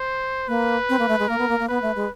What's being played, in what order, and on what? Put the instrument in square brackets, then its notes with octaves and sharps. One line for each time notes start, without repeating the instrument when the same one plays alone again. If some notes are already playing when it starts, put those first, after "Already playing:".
Already playing: [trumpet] C5
[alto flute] A#3 [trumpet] B4
[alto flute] C4
A#3
A3
G#3
[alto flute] A#3 [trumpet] A#4
[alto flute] B3
A#3
A#3
[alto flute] B3 [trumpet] B4
[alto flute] A3
G#3